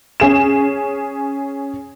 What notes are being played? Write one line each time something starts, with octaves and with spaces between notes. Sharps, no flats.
C#4 G#4 E7